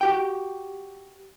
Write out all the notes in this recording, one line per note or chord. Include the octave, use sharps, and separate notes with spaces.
F#4 G4 G5